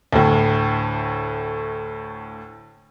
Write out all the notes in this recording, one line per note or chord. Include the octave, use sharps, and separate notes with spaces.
D2 A2